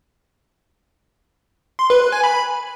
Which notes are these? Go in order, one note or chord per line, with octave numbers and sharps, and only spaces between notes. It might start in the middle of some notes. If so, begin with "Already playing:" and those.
C6
B4
B4
G#5
B5